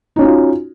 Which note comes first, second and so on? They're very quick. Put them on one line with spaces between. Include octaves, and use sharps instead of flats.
D#4 C#4 F#4 F4